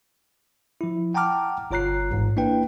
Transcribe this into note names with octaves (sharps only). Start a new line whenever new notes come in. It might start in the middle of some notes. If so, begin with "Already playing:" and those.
F3 E4
F#5 G5 A5 A#5 D6 F6
G1 F4 C#5 A#5 F#6 C7
A1 G#2
A#3 D4 E4 B4 G5